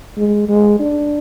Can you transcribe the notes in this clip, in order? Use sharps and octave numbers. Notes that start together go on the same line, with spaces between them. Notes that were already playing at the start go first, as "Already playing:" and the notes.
G#3
G#3
D4